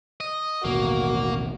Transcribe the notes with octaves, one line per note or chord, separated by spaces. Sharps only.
D#5
A1 D#2 B2 A#3 F#4